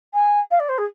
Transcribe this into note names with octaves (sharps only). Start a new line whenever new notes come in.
G#5
F5
D5
C5
G#4